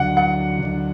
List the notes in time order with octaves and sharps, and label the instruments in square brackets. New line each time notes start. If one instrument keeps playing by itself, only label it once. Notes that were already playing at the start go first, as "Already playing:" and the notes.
Already playing: [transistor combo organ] D2 D3 F#3 [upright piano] F#5
[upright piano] F#5
[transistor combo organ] D2 D3 F#3